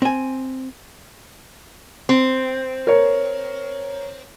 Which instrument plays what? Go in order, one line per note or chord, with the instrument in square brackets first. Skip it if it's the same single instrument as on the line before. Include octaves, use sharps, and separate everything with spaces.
[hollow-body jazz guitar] C4 G#5
[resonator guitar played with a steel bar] C4
[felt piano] A#4 C#5